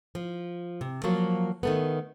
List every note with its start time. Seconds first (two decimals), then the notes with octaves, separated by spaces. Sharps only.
0.15 F3
0.81 C3
1.04 F3 F#3 A#3
1.63 D#3 A3 B3